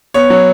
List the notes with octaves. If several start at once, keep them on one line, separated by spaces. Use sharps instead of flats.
B3 C#5
F#3